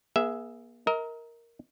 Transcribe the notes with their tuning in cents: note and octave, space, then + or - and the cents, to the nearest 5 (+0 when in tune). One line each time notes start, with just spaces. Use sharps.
A#3 +40 G#4 +0 E5 +0
A#4 +0 D#5 +40